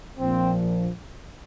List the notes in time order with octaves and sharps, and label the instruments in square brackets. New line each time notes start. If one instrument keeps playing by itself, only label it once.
[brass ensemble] A#1 A#2 F3 C4